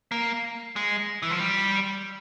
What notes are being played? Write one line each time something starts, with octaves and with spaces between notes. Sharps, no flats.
A#3
G#3
E3
F3
G3